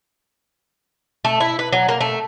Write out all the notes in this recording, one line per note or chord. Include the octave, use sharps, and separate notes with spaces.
A3
E4
B4
F#3
A#3
A3